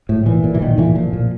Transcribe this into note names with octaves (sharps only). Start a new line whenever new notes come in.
A2
A#2 E3
A#2
E3
A#2 D#3
A#2 E3
A#2 F3
A#2